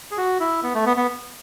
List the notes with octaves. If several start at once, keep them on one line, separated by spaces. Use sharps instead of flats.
G#4
F#4
E4
B3
A3
B3
B3